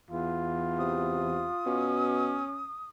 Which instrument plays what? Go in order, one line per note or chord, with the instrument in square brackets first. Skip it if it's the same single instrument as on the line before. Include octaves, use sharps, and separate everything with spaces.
[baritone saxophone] E2 [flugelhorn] F4
[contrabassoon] C3 [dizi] D#6
[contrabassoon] B2 [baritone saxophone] C#4